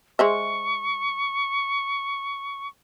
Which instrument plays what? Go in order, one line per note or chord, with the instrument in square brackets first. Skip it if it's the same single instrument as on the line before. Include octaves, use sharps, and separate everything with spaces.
[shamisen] G#3 C5 E5 [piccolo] C#6